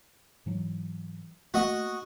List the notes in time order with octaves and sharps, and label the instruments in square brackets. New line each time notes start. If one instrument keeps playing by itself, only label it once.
[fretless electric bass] G#2 E3 F#3
[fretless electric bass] A3 A#3 [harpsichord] F#4 D#5